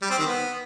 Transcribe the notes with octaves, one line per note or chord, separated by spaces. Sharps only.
G3
C4
D#3
B3